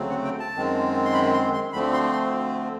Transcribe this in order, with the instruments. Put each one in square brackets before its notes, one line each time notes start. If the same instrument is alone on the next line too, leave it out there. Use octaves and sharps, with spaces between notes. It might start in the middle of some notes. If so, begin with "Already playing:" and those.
Already playing: [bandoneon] D2 C#3 F#3 A3 C4
F#5
G5
A5
F#2 D#3 G#3 C4
C6
B5
C6
C6
D2 D3 F3 A3 C4 B5
C6
C6